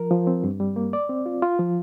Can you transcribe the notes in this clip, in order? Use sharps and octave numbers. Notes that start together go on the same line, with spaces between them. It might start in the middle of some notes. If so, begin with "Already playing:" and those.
Already playing: F3 A#4
F3
C4
G2
G3
A#3
D5
C4
F4
F4
F3